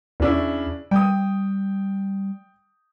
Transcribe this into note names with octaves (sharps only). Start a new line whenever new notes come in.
E2 C#3 D4 E4
G3 G5 D#6